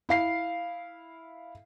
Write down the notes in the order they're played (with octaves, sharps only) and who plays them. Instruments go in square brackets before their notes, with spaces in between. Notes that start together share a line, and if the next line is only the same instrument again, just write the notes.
[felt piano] E4 F5 C7